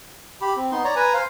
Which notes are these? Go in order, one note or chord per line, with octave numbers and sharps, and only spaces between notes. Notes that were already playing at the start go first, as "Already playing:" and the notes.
G4 B5
C4
B3 D#4 C6
C#5 D5 A#5
B4 G#5 A#5
C5 F5